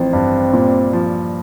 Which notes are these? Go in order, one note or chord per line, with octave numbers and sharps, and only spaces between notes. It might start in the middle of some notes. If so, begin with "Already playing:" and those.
Already playing: A1 F3 C4
G2
A#2
F3